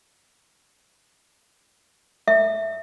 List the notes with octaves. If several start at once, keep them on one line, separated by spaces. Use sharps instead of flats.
E5